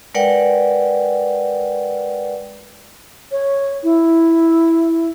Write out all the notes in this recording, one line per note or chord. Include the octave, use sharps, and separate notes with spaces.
G#3 A#4 B4 D5 F#5 G5
C#5
E4